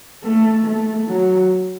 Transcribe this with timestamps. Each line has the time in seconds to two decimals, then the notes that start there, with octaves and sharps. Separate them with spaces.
0.24 A3
0.66 A3
1.08 F#3